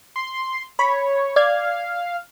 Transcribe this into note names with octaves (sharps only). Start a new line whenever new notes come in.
C6
C#5 B5
D5 F5 G#6